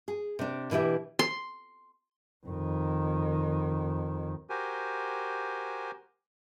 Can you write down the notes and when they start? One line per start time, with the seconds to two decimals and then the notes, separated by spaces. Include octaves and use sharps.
0.08 G#4
0.39 C3 D4
0.71 B2 E3 D4 G4 E5
1.19 C6
2.46 F2 D#3
4.50 F#4 G4 A#4 C5 G#5